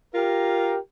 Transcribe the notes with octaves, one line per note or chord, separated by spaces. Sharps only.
F4 G4 A#4